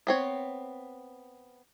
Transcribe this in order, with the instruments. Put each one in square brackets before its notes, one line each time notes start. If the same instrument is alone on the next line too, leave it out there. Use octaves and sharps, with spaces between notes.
[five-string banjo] B3 C4 C#5